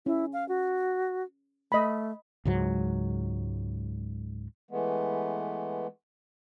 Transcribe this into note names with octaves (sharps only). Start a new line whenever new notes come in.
C#4 E4
F5
F#4
A3 D#5 B5
C#2 G#2 F#3
E3 G#3 A3 B3